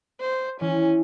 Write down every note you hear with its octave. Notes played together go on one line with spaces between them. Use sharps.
C5
E3 C#4